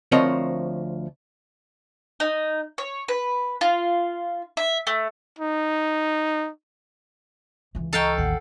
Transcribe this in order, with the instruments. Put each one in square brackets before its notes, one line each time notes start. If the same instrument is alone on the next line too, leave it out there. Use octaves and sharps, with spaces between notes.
[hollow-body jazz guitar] D2 F3 C4 A#4 C#5 D#5
[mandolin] D#4
C#5
B4
F4
E5
A3
[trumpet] D#4
[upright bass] C#2 E3
[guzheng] A4 F5 G5 [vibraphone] D#5 A#5 C#6
[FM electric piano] A1 D#2 [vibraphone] F#5